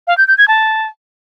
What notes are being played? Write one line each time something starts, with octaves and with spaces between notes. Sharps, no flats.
F5
G6
G6
G#6
A5